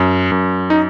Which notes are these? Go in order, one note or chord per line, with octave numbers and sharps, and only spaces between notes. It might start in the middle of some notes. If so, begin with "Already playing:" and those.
Already playing: F#2
F#2
D#4